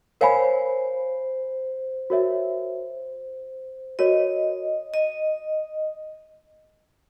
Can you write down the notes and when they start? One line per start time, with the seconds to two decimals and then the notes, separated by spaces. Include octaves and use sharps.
0.21 A#4 C5 C#5 F5 G#5 B5
2.10 F#4 A#4 C#5 E5
3.99 F#4 A#4 C#5 D#5
4.94 D#5